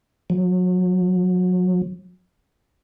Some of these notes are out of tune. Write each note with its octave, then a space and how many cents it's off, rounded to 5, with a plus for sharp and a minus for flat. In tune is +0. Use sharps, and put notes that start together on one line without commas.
F#3 -30